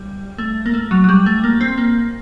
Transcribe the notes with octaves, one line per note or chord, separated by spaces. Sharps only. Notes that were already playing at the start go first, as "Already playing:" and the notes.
Already playing: G3
A3
A#3
A3
F#3
F#3
G3
A3
A#3
C4
A#3